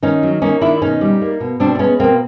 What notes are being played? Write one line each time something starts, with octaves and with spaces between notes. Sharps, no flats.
D#3 C#4 D#4
F#3
A#3 C#4 D#4
D#3 D4 E4
B2 C#4 D#4
G3
A#3
B2
B2 C4 D4
C4
G#3 B3 C#4
B2 A#3 C4